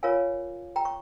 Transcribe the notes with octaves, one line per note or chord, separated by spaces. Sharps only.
F4 A#4 C#5 F5 G#5
G5 A#5
C#6